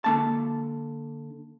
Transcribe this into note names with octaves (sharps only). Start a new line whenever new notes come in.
D3 A#3 A5